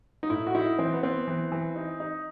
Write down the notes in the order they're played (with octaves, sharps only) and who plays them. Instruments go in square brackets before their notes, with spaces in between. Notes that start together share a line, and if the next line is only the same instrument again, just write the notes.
[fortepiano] D#4
[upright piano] A2 [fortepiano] E4
[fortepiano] F#4
[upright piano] D#4 [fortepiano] E4
[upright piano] E3 [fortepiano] C4
[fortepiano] B3
[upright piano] B3 [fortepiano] C4
[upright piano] E3
E3
D#4
D#4